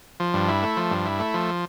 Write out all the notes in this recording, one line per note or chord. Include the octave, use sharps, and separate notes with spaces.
F3
G2
E4
A3
F3
G2
E4
A3
F3